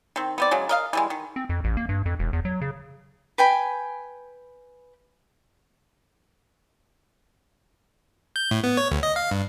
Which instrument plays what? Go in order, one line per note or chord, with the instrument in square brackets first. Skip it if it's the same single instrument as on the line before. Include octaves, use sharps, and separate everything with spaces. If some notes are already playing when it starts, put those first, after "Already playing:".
[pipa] D#3 C4
B3 C4 D5
C#3 F#3 G#3
A#4 D#5 F5
E3 G3 G#3
D#3
[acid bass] C4
F2
A1
A#3
G2
F2
E1
E2
F#3
C#3
[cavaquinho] B4 G5 G#5 B5
[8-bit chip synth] G6
A2
B3
C#5
D2
D#5
F5
G2